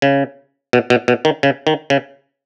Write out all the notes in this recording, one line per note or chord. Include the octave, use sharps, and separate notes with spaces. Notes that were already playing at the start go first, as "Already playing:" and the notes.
C#3
B2
B2
B2
D#3
C#3
D#3
C#3